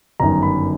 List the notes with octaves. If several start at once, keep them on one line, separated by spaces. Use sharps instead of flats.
G1 F#2 D#3 A#5
B5